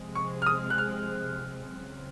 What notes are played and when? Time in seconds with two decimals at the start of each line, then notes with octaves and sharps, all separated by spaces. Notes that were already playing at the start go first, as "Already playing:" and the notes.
Already playing: C3 F3 G#3 C4
0.15 C#6
0.42 F6
0.46 D#6
0.70 F#6
0.78 F6
1.71 C#3 F#3 C4